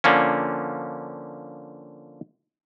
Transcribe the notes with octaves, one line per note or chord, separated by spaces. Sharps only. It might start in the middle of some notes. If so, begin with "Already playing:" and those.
D3 F3 A#3 C#4